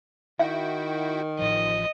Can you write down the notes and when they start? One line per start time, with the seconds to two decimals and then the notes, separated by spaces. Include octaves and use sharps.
0.39 D#3 E4 F#4 E5 G5
1.39 A1 F3 D#5